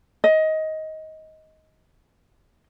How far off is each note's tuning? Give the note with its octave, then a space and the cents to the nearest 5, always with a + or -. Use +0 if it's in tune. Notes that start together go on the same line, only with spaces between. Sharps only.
D#5 +15